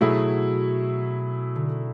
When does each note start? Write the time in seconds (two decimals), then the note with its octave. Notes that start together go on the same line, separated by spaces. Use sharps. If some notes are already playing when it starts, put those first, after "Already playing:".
0.01 B2 F#3 A3 E4 G#4
1.56 D3